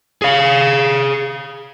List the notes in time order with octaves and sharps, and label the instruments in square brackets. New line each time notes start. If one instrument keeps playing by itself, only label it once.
[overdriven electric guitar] G#4 F5